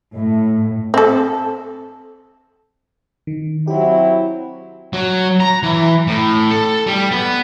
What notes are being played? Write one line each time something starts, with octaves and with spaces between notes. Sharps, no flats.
A2
C4 A4
D#3
F#3 C4 E4 G4
F#3
A#5
E3
A2
A4
G3
B3